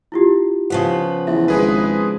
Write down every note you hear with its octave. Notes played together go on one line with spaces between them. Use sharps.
E4 F4 G4
C#3 F3 B3
E2 E4 E5
G#1 G#3 G#4 B4